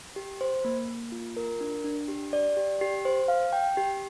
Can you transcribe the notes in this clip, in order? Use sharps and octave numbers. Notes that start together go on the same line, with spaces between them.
G4
C5
A#3
A#3
F4
A#4
D4
D4
G4
D5
G4
G4
C5
F5
G5
G4